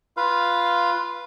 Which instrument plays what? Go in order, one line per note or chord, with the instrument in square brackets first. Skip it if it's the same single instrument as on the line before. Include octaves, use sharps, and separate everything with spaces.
[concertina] F4 B4 F5